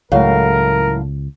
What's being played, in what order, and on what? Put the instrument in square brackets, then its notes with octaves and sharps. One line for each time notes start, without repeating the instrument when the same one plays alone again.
[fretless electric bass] C#2 [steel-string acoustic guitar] A2 F#3 F5 [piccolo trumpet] A#4